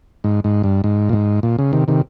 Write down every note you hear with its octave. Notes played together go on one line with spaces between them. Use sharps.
G#2
G#2
G2
G#2
A#2
G#2
A#2
C#3
C3 D#3
C3 D#3